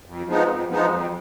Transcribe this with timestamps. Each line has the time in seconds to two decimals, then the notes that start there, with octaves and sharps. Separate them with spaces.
0.06 F2
0.27 F3 G#3 B3 D#4
0.48 F2
0.69 F3 G#3 B3 D#4
0.89 F2